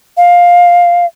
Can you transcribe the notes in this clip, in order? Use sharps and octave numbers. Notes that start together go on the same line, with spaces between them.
F5